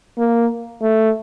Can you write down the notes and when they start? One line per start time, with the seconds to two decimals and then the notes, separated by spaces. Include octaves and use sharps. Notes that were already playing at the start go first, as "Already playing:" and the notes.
0.18 A#3
0.82 A3